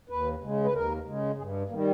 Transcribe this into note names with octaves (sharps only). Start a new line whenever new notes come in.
D#2 B4
C#3 G#3
B4
D#2 A#4
C#3 G#3
G2 G#4
D#3 G3 A#3